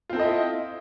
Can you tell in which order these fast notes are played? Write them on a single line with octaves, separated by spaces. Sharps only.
F4 C4 A4 D#5 E4